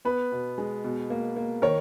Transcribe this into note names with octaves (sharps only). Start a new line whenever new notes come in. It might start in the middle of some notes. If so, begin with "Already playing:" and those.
B3 B4
B2
G#3
B2
A#3
A#3
D#3 A#4 C#5